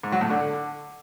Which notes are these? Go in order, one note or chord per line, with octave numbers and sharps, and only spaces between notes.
G#2
F#3
A2
D3